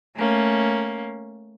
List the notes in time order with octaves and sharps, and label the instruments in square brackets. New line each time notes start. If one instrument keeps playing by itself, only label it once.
[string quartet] A3 A#3 C#4